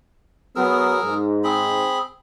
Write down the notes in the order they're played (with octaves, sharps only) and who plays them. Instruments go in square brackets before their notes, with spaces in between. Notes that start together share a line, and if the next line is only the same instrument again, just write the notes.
[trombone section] F#3 B3 [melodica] G#4 A#4 E6
[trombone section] G#2
[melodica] C4 G#4 B5